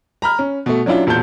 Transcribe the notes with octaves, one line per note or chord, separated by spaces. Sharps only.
A#5 B5 F6
C#4
B2 A3
F#3 C#4 D4 E4 F4
E1 A#2 A5 G6